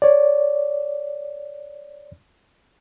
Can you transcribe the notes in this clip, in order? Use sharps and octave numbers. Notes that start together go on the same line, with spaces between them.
C#5 D5